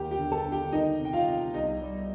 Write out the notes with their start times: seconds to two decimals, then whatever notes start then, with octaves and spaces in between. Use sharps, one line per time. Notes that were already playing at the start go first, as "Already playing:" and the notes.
Already playing: D#2 G4 G5
0.11 G4 G5
0.18 D3
0.32 A4 A5
0.46 D3
0.52 G4 G5
0.72 D#3 D#4 D#5
1.00 C3
1.05 G5
1.13 F4 F5
1.27 C3
1.54 C2 D#4 D#5
1.81 G3